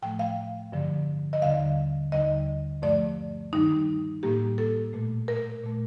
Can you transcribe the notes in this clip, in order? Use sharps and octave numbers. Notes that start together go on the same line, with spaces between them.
A2 F3 A3 G5
F5
G2 D3 F3
D#5
D#2 D3 G3 F5
D#2 D3 G3 D#5
G2 F3 A3 D5
G2 D#3 G3 D#4
A2 G3 A#3 G4
A4
A#2 A3
A#4
A#2 A3